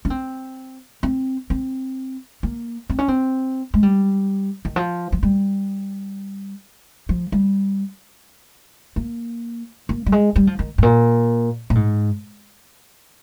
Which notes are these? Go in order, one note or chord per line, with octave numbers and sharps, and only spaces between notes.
C#4
C4
C4
C4
A#3
C4
C#4
C4
G#3
G3
D#3
F3
F3
G3
F3
G3
A#3
A#3
G3
G#3
G3
F3
D#3
G#2
A#2
A#2
G#2